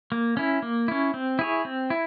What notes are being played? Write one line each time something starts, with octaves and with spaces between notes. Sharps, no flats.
A#3
C#4 E4
A#3
C#4 E4
C4
E4 G#4 C#5
C4
E4